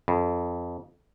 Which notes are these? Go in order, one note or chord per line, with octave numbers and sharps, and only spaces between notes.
F2